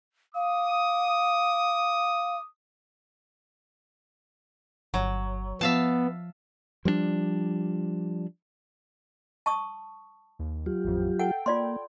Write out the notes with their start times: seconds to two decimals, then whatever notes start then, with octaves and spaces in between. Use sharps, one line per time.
0.35 F5 D6 D#6
4.94 G1 F#3
5.61 F3 B3 E5 F5 A5
6.85 F3 G3 A#3 D4
9.46 A5 C#6 D#6
10.39 D#2
10.66 F#3 F4 G4
10.84 A1 F2
11.19 A4 F#5 G5
11.46 A#3 F4 D5 C6